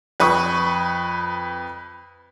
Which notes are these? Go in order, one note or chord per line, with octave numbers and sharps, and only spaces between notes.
F2 B4 B5 C#6 D#6